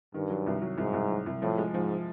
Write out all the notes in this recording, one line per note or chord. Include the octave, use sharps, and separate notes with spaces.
G2 D#3
F#3
C2
F#3
C2 G#2
C2
F#3
C2
A2 F3
G#3
G#2 F3